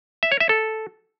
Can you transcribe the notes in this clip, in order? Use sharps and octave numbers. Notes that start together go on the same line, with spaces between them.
E5
C#5
E5
A4